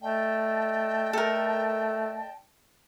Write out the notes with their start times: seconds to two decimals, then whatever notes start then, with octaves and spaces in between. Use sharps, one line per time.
0.02 A3 D5 D#5 G5 A5
1.13 A3 A4 A#4